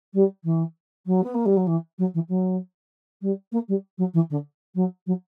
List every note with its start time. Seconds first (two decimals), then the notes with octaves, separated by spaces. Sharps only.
0.14 G3
0.44 E3
1.06 F#3
1.23 B3
1.34 A#3
1.45 G3
1.56 F#3
1.67 E3
1.98 F#3
2.14 E3
2.28 F#3
3.21 G3
3.52 A#3
3.68 G3
3.98 F#3
4.14 E3
4.30 D3
4.75 F#3
5.06 F#3